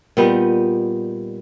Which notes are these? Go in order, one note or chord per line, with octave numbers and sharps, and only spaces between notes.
A#2 G3 B3 D#4